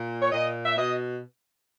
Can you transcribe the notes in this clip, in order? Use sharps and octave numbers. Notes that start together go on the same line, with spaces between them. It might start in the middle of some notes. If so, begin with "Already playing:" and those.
Already playing: A#2
C#5
A#2 D#5
E5
B2 D#5